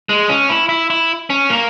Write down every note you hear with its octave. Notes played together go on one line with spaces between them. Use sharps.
G#3
C#4
E4
E4
E4
C#4
A#3